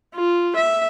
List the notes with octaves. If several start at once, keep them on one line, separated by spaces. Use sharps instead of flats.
F4
E5